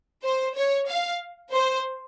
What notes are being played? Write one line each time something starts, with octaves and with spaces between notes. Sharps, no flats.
C5
C#5
F5
C5